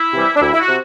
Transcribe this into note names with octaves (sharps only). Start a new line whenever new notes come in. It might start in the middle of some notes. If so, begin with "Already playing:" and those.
Already playing: E4
C3 E3 G3
D4
D2 E4
E4
F#4
C3